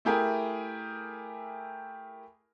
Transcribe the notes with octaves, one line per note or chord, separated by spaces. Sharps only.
A3 E4 G4 G#4 A#4 G#5